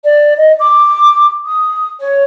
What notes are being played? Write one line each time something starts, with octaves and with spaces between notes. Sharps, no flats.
D5
D#5
D6
D#6
C#5